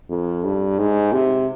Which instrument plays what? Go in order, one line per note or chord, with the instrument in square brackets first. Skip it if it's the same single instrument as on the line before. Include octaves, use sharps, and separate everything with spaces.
[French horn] F2
G2
G#2
C3